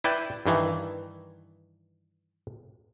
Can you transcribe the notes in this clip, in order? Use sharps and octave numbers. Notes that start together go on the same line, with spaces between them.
E4 B4 D5 G5
G2 D#3 E3